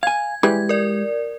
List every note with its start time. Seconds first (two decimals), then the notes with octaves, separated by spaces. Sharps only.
0.03 F5 G#5 G#6
0.43 E3 G3 G#3 G4 G#4 G#6
0.69 A#4 D5